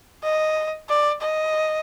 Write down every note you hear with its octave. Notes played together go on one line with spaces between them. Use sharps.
D#5
D5
D#5